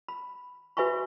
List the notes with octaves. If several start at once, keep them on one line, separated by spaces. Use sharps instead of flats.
B5
F#4 B4 E5 G#5 B5 C#6